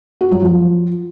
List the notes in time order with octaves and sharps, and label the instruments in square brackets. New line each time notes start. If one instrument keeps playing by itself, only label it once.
[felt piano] F#4
F#3
F3